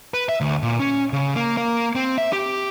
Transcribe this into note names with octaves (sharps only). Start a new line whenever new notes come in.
B4
E5
D2
A#2
C#4
C#3
A#3
A#3
C4
E5
G4